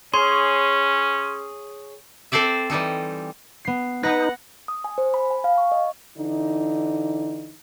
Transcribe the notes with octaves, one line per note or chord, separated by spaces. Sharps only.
C#4 G#4 C#5 C6
C4 A4 C5 D5 E5
E3 G3 D#4 A4
B3 C7
B3 D#4 B4 F#5 A#6
D#6
G#5
C5
B5
G#5
F5
C#6
D#5
D3 E3 D#4